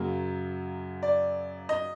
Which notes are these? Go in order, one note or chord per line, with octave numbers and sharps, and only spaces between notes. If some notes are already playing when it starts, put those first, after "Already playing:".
Already playing: F#2 C#3 F#3 A#3
D5
D#5